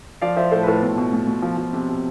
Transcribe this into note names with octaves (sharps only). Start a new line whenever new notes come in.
F3 D5 F5
F3 C5 E5
A2 A4 C5
B4
A2 F4 A4
B2
B2
B2
B2
F3
F3
C3
C3